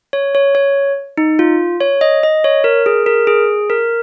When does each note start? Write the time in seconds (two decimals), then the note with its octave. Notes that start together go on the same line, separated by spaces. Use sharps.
0.13 C#5
0.35 C#5
0.55 C#5
1.18 D#4
1.39 F4
1.81 C#5
2.01 D#5
2.23 D#5
2.44 C#5
2.64 A#4
2.86 G#4
3.06 A#4
3.27 G#4
3.70 A#4